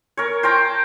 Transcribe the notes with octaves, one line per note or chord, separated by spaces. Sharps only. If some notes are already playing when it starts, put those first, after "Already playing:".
A#4 C#5
C5 G5 A5 A#5